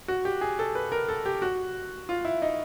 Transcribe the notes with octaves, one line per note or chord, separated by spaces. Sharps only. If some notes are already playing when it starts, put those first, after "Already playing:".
F#4
G4
G#4
A4
B4
A#4
A4
G4
F#4
F4
E4
D#4